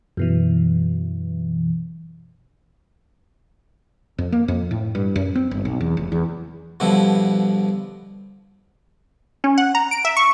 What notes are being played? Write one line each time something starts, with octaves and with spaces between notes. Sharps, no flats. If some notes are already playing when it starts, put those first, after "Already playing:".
F#2 B2 E3
F2
A#3
F2
A2
G2
F#2
C4
G1
B1
E2
F1
E2
G2 B2 D3 F3 E4
C#4
F#5
A#5
D7
E5
C#6